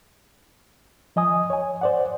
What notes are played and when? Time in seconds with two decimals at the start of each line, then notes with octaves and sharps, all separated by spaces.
1.16 F3 D#5 G#5 D#6
1.50 C#5 G#5
1.81 C5 D5 F#5